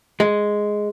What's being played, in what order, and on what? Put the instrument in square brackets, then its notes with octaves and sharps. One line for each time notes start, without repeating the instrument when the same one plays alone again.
[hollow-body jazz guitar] G#3